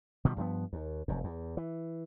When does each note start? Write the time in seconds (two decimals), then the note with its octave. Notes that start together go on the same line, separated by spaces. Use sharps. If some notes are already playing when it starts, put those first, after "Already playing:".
0.25 B2 D#3 F3 G3
0.37 G2 F3 F#3 B3
0.73 D#2
1.08 F1 F#2
1.24 E2
1.57 E3